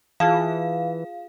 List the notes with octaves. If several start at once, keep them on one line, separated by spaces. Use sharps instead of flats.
E3 F4 G#4 F5 A5